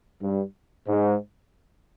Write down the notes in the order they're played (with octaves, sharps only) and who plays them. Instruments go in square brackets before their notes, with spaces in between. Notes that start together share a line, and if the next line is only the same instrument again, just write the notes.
[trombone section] G2
G#2